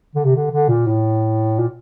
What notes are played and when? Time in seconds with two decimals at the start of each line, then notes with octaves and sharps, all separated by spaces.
0.15 D3
0.25 C3
0.36 D3
0.51 D3
0.69 A#2
0.87 A2
1.59 A#2